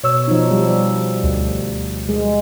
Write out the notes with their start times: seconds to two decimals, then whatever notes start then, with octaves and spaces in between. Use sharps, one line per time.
0.04 B2 C#5 E6
0.28 F3 D#4
0.51 G3
1.23 D2
2.09 G#3